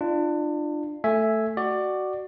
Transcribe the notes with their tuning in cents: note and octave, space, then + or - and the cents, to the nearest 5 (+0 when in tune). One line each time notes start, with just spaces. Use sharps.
D4 +25 F4 -25
A3 +0 E5 +0 G#5 +0
F#4 +15 D5 +20